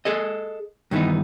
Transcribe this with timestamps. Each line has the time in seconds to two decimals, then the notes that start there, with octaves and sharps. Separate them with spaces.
0.05 G#4 A4 D#5
0.91 G2 D#3 E3 B3 D#4